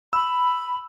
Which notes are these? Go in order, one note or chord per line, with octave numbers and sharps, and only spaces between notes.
B5 E6